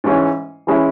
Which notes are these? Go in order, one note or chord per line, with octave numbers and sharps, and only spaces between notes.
G#2 E3 G#3 C#4 E4
E3 G#3 C#4 E4